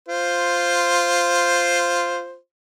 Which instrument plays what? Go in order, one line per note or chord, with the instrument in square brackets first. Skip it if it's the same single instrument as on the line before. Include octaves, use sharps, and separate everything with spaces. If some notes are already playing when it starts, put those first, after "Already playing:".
[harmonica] F4 C5